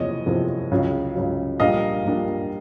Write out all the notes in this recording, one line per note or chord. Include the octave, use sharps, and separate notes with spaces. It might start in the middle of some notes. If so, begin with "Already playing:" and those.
Already playing: F#1 E2 C3 F3 C#5 D#5
F#1 E2 C3 F3
C#2 C#3 F#3
C#2 C#3 F#3
A#1 A#2 G3 A#3 D4 D#5 F5
A#1 A#2 G3 A#3 D4